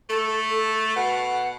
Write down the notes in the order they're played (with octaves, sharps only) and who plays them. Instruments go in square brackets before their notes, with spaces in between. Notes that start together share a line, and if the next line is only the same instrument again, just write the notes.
[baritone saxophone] A3 [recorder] A4
[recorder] A4
[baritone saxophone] B2 [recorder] F#5